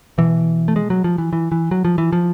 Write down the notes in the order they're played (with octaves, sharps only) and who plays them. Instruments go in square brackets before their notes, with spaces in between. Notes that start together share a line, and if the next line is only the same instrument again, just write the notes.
[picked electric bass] B2 E3
A3
G#3
F#3
F3
E3
E3
E3
F#3
F3
E3
F3